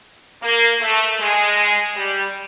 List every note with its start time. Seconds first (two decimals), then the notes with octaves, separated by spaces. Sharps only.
0.42 A#3
0.81 A3
1.20 G#3
1.96 G3